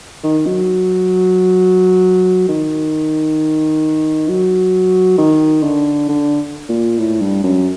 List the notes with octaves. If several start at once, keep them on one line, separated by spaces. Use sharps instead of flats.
D#3
F#3
D#3
F#3
D#3
D3
D3
A#2
A2
G2
F#2